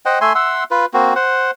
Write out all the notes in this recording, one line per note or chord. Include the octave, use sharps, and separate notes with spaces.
C5 D#5 F#5 G5
A3 E5 G#5 C6
E5 F#5 C6 E6
F4 B4
A#3 C4 F#4
C5 F#5